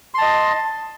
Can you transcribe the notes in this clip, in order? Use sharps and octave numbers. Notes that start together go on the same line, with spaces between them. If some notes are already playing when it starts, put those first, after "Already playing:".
D#5 A5 C6